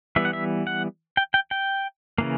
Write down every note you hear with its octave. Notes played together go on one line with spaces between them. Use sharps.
E3 G3 B3 E5
F#5
E5
F#5
G5
G5
G5
C#3 E3 A#3